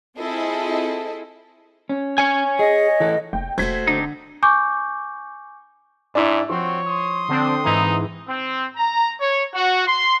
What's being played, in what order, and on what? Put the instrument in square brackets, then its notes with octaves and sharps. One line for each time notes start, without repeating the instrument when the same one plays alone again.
[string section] C4 E4 F4 G#4 A4 D#5
[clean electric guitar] C#4
[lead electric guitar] C#5 G#5
[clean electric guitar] G#4 [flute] D#5
[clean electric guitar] E3 A4
[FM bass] F1 [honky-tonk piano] G5
[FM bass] E1 [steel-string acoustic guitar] A3 F#4 C5 [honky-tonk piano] G#6 B6
[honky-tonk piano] D3 [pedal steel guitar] C4 D4 D#4
[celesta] G#5 C#6 D6 G6
[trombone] G#2 [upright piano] D4 E4
[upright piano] F3 [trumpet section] C4 F#4 C6 [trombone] C#5
[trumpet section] C6 D#6
[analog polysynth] D3 C4 D4
[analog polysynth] G#2 E3 [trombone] D#4
[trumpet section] C4
A#5
C#5
F#4
C6